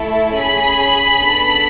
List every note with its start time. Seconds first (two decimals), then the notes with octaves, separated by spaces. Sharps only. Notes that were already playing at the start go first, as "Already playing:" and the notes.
Already playing: A3 E4 A4
0.36 C#4 G#4 B5
1.21 B3 D4 A4